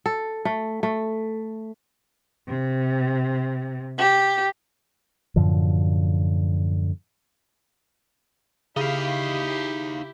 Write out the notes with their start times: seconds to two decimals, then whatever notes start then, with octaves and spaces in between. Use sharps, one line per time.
0.06 A4
0.45 A3
0.83 A3
2.48 C3
3.98 G4
5.36 F#2 A2 D3 F3
8.77 C#3 D#4 E4 G4 F5